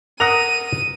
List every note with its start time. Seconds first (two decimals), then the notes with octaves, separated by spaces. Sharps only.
0.20 A#4 F#5 D#6 A#6 D#7 F7